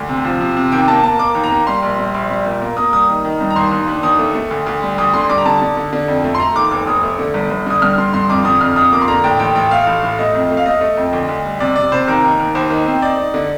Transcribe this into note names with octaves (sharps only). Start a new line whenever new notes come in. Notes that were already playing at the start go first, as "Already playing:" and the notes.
Already playing: D2
C3
F3
C3
C3
D#2 G5
A#3 A5
A#3 A5
A#3 D6
D#2
A#5
A#3
G3 C6
A#1
G3
A#1
G3
A#2
A#3
A#3 D#6
G3 D#6
D#3
D#3
G2
A#5
D#2 C6
D#2
D4
D#2 D#6
A3
A3
D2
D2
G3
D2 D#6
D3 C6
G3 D6
A#5
D3 A5
D3
D3
D3
F2
A3
C6
A3 A#5
D#2 D6
F1 D6
F1 D#6
A3
D3
G1
G1
D3 D#6
G2 F6
D3 C6
G2 C6
F2 D6
D3 D#6
F2 F6
F2 D#6
A#3 D6
C6
D3 A#5
A2 G5
A1 G5
A1 G5
A3 F5
A1
A2
A3 D#5
F2
A3
F5
A3 D#5
A3
F2
D2
D2
G3
C3 D5
C3 D5
C3 C5
D#2 A#4
D#3
D#2
D#2 C5
D#3
C4
D#4 D5
D#4
D3